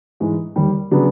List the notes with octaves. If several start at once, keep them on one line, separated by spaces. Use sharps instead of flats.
G#2 E3 G#3
D#2 D#3 G3
C#3 F#3 B3 D4